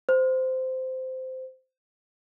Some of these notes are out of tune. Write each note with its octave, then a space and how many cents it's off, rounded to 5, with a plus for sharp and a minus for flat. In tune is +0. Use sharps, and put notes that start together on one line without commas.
C5 -15